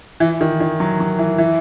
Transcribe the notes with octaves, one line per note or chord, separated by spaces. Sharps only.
E3
D#3
D#3
F#3
F#3
E3
E3